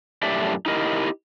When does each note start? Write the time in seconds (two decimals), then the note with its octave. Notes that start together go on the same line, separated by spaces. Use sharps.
0.23 F#2 A2 D4 G4 D5 E5
0.66 D#4 E4 G4 A#4 D#5